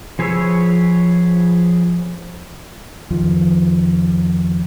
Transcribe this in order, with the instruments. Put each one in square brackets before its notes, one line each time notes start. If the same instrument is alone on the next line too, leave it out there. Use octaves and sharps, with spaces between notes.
[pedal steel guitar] F3 G#4 B4 C#5 E6
[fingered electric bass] F2 D#3 F3